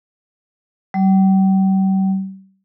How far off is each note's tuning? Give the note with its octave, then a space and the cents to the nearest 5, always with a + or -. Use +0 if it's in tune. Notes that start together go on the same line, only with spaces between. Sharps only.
G3 -40